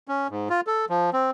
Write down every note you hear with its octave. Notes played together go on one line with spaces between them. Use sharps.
C#4
G#2
F4
A4
F3
C4